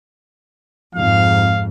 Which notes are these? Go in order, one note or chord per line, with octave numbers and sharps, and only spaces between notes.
F2 G#2 F5